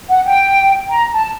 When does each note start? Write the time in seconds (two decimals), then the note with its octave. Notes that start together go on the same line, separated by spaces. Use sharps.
0.09 F#5
0.26 G5
0.90 A#5
1.12 A5